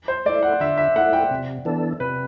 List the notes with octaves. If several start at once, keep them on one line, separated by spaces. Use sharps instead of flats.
C5
A3 E4 D5
F#5
D3 E5
E5
A3 E4 F#5
G5
C3
E3 B3 D4 A4
C3 B4